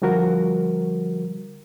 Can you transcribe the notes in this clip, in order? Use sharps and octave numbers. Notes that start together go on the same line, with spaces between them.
D3 F3 G3 F#4 A#4